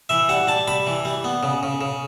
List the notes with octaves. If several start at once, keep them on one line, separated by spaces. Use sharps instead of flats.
E3 E5
G3 F#5
G3 A5
G3 B5
E3
G3
B3
C#3
C#3
C#3